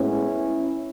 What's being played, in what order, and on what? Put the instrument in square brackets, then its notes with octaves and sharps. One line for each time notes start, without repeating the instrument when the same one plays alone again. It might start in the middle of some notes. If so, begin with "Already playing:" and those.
Already playing: [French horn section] A2 G#3 B3 C#4 E4